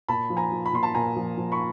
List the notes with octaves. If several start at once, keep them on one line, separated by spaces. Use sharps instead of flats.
A#2 A5 B5
F3
G#5 A#5
F3
B5
A#2 C6
A5 B5
A#2 G#5 A#5
F3
F3
B5 C#6